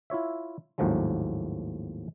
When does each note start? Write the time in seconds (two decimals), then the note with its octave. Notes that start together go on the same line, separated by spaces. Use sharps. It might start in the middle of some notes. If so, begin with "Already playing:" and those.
0.10 E4 F4 C#5 E5
0.78 G#1 D#2 A2 F3 F#3 G#3